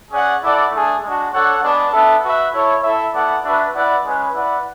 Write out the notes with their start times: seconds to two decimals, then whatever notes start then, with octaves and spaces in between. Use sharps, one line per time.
0.11 C#4 G#4 D5 F#5
0.41 E4 A4 D5 F#5
0.71 A3 D4 G#4
1.02 G#3 D4 F#4
1.32 D4 A4 C#5 F#5
1.62 G#3 B3 D4
1.92 B3 D4 A4 E5
2.22 F#4 B4 E5
2.52 E4 A4 C#5
2.82 E4 A4 E5
3.12 B3 E4 A4 D5 F#5
3.42 D4 F#4 B4 E5
3.73 E4 B4 D5 F#5
4.03 G#3 C#4 G#4 B4
4.33 E4 B4 D5 F#5